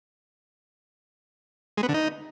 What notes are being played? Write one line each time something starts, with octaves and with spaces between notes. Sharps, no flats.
G#3
B3
D3
D#4